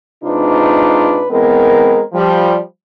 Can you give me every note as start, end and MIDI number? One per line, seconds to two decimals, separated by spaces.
0.24 1.25 48
0.24 1.25 56
0.24 1.25 62
0.24 1.25 63
0.24 1.25 65
0.24 1.25 71
1.31 2.01 52
1.31 2.01 56
1.31 2.01 59
1.31 2.01 60
1.31 2.01 70
2.14 2.59 53
2.14 2.59 55